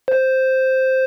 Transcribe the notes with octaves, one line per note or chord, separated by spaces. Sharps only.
C5